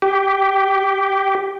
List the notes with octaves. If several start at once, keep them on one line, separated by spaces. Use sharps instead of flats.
G4